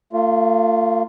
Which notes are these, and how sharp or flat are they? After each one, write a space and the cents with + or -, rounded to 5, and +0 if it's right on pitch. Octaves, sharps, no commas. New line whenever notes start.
A3 +45 F4 +0